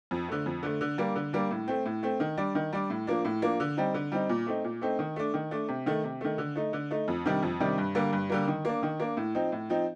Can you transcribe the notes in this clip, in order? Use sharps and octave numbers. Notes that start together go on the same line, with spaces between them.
F2
D3 A3
F2
D3 A3
D3
G3 A#3 D4
D3
G3 A#3 D4
A2
A3 C4
A2
A3 C4
D#3
G3 D4
D#3
G3 D4
A2
F3 A#3 D4
A2
F3 A#3 D4
D3
G3 C4 D#4
D3
G3 C4 D#4
A#2
A3 C4 D#4
A#2
A3 C4 D#4
D#3
A3 D4
D#3
A3 D4
C3
D#3 A3
C3
D#3 A3
D3
A3 D#4
D3
A3 D#4
F2
C3 D#3 G3 D4
F2
C3 D#3 G3 D4
G2
D3 G3 A#3
G2
D3 G3 A#3
D#3
A#3 D4
D#3
A#3 D4
A2
F3 C4 D#4
A2
F3 C4 D#4